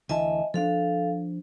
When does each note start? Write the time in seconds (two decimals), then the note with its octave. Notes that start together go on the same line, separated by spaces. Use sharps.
0.09 D2 E3 D#5 E5 G#5 A5
0.54 F3 D4 A4 F5